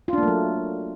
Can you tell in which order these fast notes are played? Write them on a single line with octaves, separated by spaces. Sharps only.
F4 D4 A#3 A3 F#3